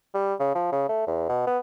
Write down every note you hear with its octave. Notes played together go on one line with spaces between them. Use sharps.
G3
C#3
F3
C#3
A3
E2
B2
B3